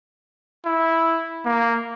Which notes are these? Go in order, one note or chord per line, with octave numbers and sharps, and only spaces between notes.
E4
A#3